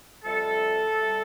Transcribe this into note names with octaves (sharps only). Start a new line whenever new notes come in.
F2 C3 G3 A4
C3 G3